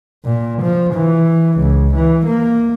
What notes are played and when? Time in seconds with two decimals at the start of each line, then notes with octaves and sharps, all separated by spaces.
0.25 A#2
0.62 F3
0.94 E3
1.58 C#2
1.95 E3
2.26 A#3